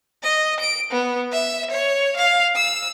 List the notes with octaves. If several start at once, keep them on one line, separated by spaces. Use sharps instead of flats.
D#5
D7
B3
E5
C#5
F5
E6